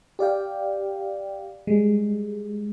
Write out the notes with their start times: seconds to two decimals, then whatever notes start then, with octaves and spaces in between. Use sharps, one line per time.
0.19 G4 D5 F5 G5
1.67 G3 G#3